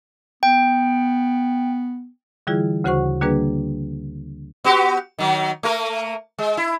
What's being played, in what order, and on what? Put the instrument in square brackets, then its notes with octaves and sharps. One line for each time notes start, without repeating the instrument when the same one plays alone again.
[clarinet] B3 [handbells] G5
[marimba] D3 E3 G3 E4 F4 G#4
D2 C#3 F#4 C5 F#5 C#6
D3 G3 A#3 D4 G#4 B4
[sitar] B3 F#4 G4
D#3 F#3
A3 A#3 A#4
G#3
E4